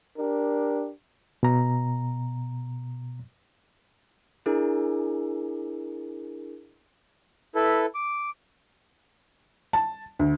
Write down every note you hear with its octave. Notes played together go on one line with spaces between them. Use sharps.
D4 G4 A#4
B2 A#5
D4 E4 G#4 A#4
E4 A4 B4
D6
A5
D2